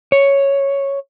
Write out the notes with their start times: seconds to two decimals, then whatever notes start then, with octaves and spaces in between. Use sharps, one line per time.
0.12 C#5